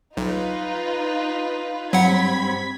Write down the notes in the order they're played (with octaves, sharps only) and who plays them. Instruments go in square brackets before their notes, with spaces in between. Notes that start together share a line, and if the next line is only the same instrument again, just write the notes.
[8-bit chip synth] B1 [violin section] D#4 F4 B4
[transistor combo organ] G2 C4 B5 [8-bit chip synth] F#3 F#5 [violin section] G#6 B6